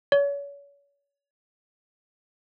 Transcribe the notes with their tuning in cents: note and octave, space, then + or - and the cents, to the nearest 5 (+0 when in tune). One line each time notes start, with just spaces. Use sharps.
C#5 +35